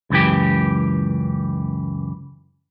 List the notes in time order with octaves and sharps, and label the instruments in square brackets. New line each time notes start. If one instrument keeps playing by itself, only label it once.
[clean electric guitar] C#2 F#2 E3 G4